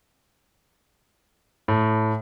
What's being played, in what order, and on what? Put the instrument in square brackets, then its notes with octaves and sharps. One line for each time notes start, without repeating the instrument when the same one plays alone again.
[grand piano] A2